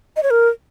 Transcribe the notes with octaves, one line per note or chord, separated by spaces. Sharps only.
D#5
C#5
A#4